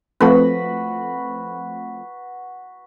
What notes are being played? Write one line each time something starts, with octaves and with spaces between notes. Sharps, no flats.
F3 A3 C4 F#4 B4